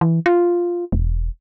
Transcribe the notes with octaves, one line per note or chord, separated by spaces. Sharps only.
E3
F4
E1